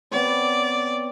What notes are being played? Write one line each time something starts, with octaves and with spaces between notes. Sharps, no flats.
B3 C4 C#5 D5